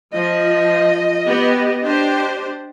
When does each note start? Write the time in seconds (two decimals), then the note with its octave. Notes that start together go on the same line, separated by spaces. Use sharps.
0.13 F3 D#5
1.26 B3 G4
1.82 D4 G4 C5